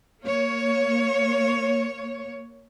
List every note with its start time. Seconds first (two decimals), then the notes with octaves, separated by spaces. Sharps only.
0.22 A#3 C#5